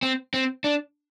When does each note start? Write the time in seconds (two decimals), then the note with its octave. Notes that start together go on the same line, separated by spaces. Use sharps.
0.03 C4
0.34 C4
0.64 D4